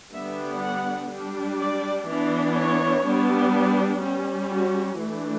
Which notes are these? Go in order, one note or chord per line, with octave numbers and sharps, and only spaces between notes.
D3 G3 B3 D4 E5
F#5
G3 D4
D5
E3 B3 D4
C#5
G3 B3 D4
G3 C#4
F#4
E3 A3 D4